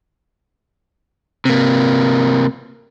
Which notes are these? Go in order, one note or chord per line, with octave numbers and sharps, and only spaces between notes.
C3 A#3